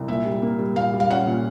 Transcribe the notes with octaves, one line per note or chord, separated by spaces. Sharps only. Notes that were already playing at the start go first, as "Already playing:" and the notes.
Already playing: C2
A#2 E5
G3
A#3
G3
A#2 F5
G3
F5
C#4 F#5
A#2